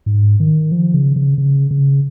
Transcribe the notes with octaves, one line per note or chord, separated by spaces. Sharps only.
G#2
D#3
F3
C#3
C#3
C#3
C#3